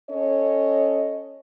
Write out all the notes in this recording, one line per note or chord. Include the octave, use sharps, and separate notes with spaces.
C#4 A4 C#5 D#5